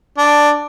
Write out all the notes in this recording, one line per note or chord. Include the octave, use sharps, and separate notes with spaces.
D4